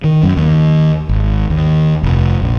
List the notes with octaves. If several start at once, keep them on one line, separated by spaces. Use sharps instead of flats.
D#3
F#2
D#2
G#1
D#2
F1
A#1